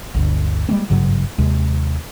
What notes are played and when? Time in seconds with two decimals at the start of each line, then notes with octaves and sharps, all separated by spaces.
0.14 G1 D2
0.69 G3 G#3 A#3 C4
0.90 G#1 G2 C#3 F#3
1.38 D#2 C3 G#3